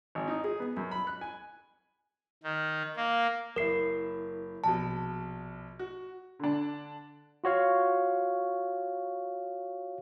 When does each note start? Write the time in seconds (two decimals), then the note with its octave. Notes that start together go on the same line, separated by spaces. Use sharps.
0.15 G#1
0.28 D#4
0.44 G#4
0.60 B3
0.77 F#2
0.91 B5
1.07 F#6
1.21 G#5
2.44 D#3
2.96 A#3
3.56 F#1 E4 A#4 C7
4.64 A#1 B2 A5
5.79 F#4
6.39 D3 D4
7.44 F4 F#4 C#5 F5